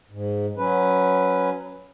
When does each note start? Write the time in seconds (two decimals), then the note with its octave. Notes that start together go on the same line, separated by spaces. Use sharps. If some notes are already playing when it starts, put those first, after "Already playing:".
0.10 G#2
0.57 F#3 C#4 B4